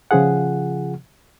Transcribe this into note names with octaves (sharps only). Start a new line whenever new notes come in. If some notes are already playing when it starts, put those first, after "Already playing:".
C#3 F3 F4 G#4 F#5